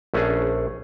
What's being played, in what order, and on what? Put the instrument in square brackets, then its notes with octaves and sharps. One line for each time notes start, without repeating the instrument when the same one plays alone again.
[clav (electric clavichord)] A#1 A3 C#4 D4 G#4